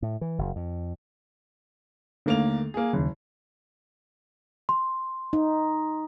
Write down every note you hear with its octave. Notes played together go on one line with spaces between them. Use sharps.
A2
E3
F#1
F2
D#2 D3 A3 A#3 F7
A#3 G#4
F#1 D#2 C#3
C6
D#4